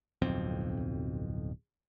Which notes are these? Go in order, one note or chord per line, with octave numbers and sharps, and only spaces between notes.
D1 B1 F2 C4